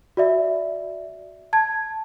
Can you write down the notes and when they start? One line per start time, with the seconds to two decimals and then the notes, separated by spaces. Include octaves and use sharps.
0.17 F#4 D5 E5
1.53 A5 G#6